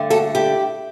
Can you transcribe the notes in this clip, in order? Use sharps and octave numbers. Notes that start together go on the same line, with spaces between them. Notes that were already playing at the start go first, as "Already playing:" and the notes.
Already playing: G2 D3 A3
F#4 A4
E4 G4